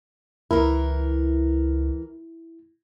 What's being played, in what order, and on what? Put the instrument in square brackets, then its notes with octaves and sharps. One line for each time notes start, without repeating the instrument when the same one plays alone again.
[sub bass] C#2 [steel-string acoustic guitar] E3 A#4 [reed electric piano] E4